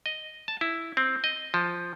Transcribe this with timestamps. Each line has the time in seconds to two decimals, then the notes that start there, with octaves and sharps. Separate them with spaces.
0.06 D#5
0.48 A5
0.61 E4
0.97 C4
1.24 D#5
1.54 F3